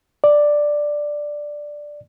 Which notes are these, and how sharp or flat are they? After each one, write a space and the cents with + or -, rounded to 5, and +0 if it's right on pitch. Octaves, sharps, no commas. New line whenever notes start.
D5 +5